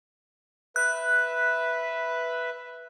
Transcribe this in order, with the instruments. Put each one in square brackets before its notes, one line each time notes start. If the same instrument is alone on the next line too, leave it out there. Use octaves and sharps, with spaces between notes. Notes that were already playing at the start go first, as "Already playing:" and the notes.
[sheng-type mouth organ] B4 E5 [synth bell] F#6